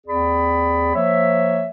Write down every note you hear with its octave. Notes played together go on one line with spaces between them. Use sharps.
D#2 C4 G#4 D5 B5
F3 A#3 C#5 E5